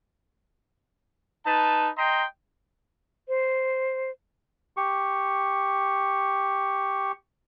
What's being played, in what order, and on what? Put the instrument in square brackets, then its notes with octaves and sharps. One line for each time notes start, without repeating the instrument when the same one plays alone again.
[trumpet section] D#4 B4 A5
D#5 G5 A#5 C6
[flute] C5
[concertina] G4 C#6